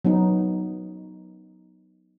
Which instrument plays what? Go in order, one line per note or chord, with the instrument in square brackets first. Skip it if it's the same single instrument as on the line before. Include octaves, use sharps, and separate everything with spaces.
[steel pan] F#3 B3 D#4